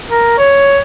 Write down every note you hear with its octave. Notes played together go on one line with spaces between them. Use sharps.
A#4
C#5